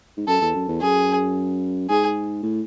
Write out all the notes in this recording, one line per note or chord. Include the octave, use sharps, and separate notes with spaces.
G#2
F#2 A4
E2
F#2
E2
F#2 G#4
G#2 G#4
A2